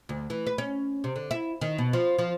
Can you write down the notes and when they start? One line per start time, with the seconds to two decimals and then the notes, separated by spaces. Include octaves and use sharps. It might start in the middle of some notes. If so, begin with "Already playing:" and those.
0.09 D2
0.30 E3
0.47 B4
0.58 C#4
1.04 C3
1.16 D3
1.31 E4
1.61 D#3
1.78 B2
1.93 F3
2.19 F3